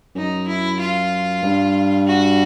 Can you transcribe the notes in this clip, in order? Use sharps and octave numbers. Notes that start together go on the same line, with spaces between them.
F#2 D#4
E4
F4
G2
F#4